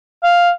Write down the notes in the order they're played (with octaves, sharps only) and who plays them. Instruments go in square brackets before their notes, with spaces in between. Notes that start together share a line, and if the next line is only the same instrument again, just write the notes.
[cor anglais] F5